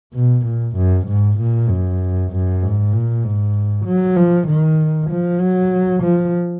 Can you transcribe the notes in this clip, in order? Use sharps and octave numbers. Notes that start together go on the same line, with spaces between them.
B2
A#2
F#2
G#2
A#2
F#2
F#2
G#2
A#2
G#2
F#3
F3
D#3
F3
F#3
F3